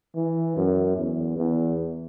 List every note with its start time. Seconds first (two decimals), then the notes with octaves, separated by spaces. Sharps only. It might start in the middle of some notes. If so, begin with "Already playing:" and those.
0.15 E3
0.56 F#2
0.97 E2
1.38 E2